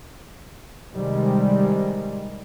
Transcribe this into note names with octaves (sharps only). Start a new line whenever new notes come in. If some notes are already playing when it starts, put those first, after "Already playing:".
C3 D#3 G3 G#3